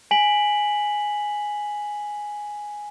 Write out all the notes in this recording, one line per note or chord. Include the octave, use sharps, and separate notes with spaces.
G#5 B6 F#7